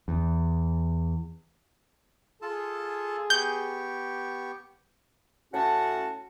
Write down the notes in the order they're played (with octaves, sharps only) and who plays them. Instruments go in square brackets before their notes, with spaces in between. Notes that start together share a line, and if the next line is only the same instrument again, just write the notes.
[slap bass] E2
[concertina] F4 A4 A5 [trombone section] G#4
[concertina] B3 G4 C#6 [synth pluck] G6
[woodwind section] A2 C#4 F#4 F#5 A5